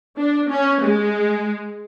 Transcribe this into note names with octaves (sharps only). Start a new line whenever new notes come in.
D4
C#4
G#3